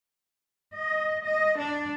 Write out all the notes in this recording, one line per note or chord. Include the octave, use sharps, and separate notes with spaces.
D#5
D#5
D4